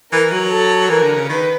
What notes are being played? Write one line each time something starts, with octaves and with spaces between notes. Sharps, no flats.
E3 A#4
F#3
A4
E3 A#4
D3
C#3
D#3 B4